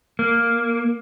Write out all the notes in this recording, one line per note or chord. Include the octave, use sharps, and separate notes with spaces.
A#3